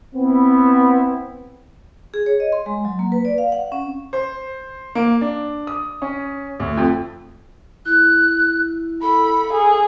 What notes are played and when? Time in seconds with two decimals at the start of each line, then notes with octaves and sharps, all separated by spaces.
0.15 B3 C4 E4
2.14 G#4
2.26 C#5
2.40 D#5
2.52 C6
2.66 G#3
2.85 F#3
2.99 A#3
3.12 B4
3.25 D5
3.38 F5
3.52 F#5
3.72 C#4
4.13 C5
4.95 A#3
5.21 D4
5.67 D#6
6.02 C#4
6.60 D2
6.77 F2
7.86 E4 F#6
9.02 A4 B5
9.53 G#4